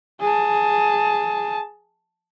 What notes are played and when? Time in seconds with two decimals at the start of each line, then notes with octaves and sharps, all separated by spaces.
0.20 G#4 A5